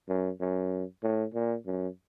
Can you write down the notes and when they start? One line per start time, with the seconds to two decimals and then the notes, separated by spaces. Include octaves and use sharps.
0.09 F#2
0.40 F#2
1.03 A2
1.34 A#2
1.66 F#2